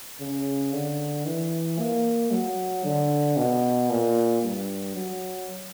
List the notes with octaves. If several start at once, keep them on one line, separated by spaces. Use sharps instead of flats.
C#3
D3
E3
A#3
F#3
D3
B2
A#2
G2
F#3